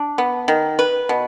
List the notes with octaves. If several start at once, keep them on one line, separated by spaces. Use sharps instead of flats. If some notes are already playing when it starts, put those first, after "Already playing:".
Already playing: D4
B3
D#3
B4
B2